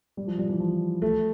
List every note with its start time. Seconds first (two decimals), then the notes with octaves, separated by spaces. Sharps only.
0.17 G3
0.27 F3
0.38 G3
0.49 E3
0.60 F3
1.02 A3